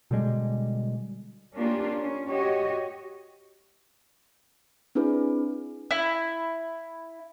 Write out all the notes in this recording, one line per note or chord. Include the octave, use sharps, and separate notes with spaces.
B2 D3 G3 G#3
A#3 C#4 D4 F4 G4
C#4
F#4 G4 C#5 D#5
C4 D4 E4 G#4 B4
E4